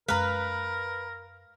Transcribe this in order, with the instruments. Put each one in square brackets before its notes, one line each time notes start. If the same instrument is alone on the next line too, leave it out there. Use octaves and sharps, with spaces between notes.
[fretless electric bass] F#2 G#3 [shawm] A#4 [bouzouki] B4 [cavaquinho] F5 A#5